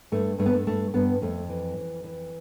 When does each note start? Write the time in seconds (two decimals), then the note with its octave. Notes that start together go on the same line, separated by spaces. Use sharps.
0.12 G2 A3
0.38 G2 A3
0.46 B3
0.54 A3
0.67 G2 A3
0.94 G2 B3
1.22 F2 A3
1.49 E3
1.77 F2
2.04 E3